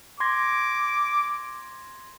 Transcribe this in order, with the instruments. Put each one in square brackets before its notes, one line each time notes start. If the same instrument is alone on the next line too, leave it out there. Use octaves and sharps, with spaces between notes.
[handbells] C6 G#6 A#6 [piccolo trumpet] D6